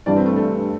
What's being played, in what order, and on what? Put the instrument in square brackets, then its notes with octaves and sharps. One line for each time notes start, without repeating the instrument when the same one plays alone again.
[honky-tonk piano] G2 E3 G3 D4 [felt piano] D5
[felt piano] C4
A3
A3